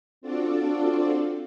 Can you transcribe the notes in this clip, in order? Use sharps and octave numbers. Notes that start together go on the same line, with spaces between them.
C4 D4 F4 F#4 A4 D5